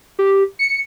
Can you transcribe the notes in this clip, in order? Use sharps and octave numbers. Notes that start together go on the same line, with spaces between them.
G4
C#7